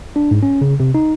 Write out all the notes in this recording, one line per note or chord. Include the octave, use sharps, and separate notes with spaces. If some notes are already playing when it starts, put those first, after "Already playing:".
D4
G#2
C#4
C#3
C3
D#4